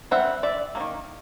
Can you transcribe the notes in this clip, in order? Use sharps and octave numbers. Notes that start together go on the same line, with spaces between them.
G3 C4 E5 F#5
D5 E5
F#3 A#3
D#3